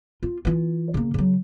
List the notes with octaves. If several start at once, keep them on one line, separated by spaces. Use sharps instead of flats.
F4
E3 F4
C#3 A#3
C#3 F#3